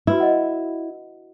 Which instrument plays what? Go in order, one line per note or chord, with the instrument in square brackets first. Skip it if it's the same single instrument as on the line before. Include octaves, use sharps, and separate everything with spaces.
[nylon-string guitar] E4 [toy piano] F#4 B4 E6
[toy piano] D#5 F#5